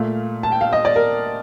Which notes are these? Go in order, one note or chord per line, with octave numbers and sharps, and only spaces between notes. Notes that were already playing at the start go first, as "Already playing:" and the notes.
Already playing: A#2 A3 F5
A5
G5
F5
D#5
D5
A#4